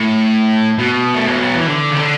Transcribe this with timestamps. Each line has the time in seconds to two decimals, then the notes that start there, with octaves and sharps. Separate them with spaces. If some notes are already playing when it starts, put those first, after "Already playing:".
Already playing: A2
0.78 B2
1.14 A3
1.27 G#3
1.41 F#3
1.54 E3
1.67 D3
1.91 C#3
1.97 D3